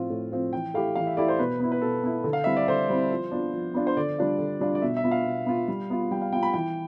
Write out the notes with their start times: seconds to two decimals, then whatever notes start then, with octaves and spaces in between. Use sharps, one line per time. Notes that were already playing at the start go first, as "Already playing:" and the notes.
Already playing: A2 F3 C4 F4
0.10 A2
0.32 F3 C4 F4
0.52 E3 G5
0.74 A3 E4 G4 F5
0.95 E3 F5
1.07 E5
1.17 A3 E4 G4 D5
1.28 C5
1.39 B2 B4
1.60 B3 E4
1.72 B4
1.81 B2 A4
2.03 B3 E4
2.24 D3
2.33 F5
2.44 G3 C4 E4 E5
2.57 D5
2.68 D3 C5
2.89 G3 C4 E4
3.11 F3
3.31 B3 D4 F4
3.54 F3
3.74 B3 D4 F4
3.87 C5
3.97 D3 D5
4.18 G3 D4 F4
4.39 D3
4.60 G3 D4 F4
4.75 D5
4.82 B2 E5
4.97 E5
5.04 B3 F4
5.11 F5
5.25 B2
5.46 B3 F4
5.68 G3
5.90 B3 F4
6.11 G3 G5
6.22 F5
6.32 B3 F4 G5
6.43 B5
6.54 E3 G5